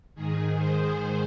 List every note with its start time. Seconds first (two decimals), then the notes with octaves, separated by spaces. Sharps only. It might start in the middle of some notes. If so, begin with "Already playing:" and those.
0.15 G#2 D#3 G#4
0.56 C5